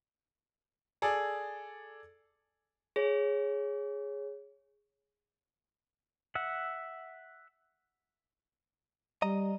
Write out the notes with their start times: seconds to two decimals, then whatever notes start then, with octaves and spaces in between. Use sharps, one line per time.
1.02 G#4 A4 D5
2.96 G#4 C#5
6.35 E5 F#5
9.22 G3 D#5 A#5